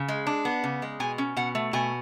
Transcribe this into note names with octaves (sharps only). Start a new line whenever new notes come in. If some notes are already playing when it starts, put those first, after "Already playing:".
Already playing: C#3
G#3
D4
B3
C#3
G#3
B2 G#5
C#4
B2 F#5
A3
B2 G#5